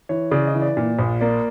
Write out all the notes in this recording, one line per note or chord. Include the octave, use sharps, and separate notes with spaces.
E3 C#5
C#3 D5
D#5
E3
D5
A#2
A#1
A#3 D5